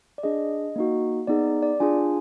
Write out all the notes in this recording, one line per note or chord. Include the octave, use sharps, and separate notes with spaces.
D5
D4 G#4 D#5
A#3 D#4 F#4
B3 D#4 G#4 D5
D5
D4 F4 G#4 G#5